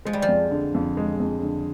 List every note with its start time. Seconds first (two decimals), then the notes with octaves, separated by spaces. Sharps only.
0.05 F3 G#3
0.13 G3
0.22 F3
0.28 F2
0.51 D3
0.74 F2
0.97 G#3
1.20 F2
1.43 D3